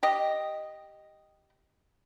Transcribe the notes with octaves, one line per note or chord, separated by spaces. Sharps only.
G4 D#5